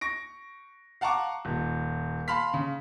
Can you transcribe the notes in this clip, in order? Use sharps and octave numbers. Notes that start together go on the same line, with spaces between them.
C#6 A#6 D7
F5 F#5 A5 A#5 C#6 D6
D#1
F5 A5 B5 C6 F6 B6
C#3